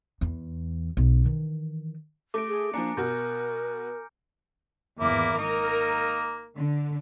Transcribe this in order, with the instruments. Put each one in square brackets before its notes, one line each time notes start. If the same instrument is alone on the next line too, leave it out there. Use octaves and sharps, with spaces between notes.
[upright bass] E2
B1
D#3 E3
[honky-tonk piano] A3 [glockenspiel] D6 A#6 D7
[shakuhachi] G#4
[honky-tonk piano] F3 D4 [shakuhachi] A#3 [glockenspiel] G#5 A#5 C#7
[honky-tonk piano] B2 F#4 [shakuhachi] A#4 [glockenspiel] F6 G6
[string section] G#1 E2 [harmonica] A#3 E4 D6
[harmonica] A#3 D#4 [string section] A#4
[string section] D3